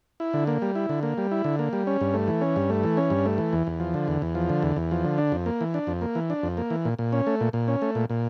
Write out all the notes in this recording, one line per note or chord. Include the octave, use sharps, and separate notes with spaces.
E4
D3
A#3
G3
E4
D3
A#3
G3
E4
D3
A#3
G3
C#4
G2
A3
E3
C#4
G2
A3
E3
C#4
G2
A3
E3
E2
E2
F3
D3
E2
E2
F3
D3
E2
E2
F3
D3
D4
F2
A#3
E3
D4
F2
A#3
E3
D4
F2
A#3
E3
A#2
A#2
C#4
A3
A#2
A#2
C#4
A3
A#2
A#2